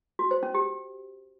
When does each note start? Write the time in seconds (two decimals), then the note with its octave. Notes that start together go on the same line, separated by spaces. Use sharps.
0.19 F#4
0.31 C5
0.43 C#4
0.54 G4